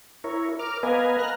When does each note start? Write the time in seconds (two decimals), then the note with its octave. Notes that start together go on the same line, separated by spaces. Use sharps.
0.24 E4 A#4 C#5
0.59 A#4 D6 F6
0.83 B3 A#4 B4 D#5 F5 G#5
1.19 A#5 F6 F#6